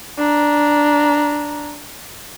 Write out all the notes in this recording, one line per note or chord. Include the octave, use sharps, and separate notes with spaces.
D4 A#5